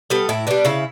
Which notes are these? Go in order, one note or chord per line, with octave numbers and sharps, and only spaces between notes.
G3 B3 A4
A2 E4
G3 B3 D4
C#3 E4